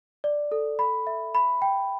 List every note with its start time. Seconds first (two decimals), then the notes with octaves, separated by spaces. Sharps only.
0.24 D5
0.52 A4
0.79 B5
1.07 E5
1.35 B5
1.62 G5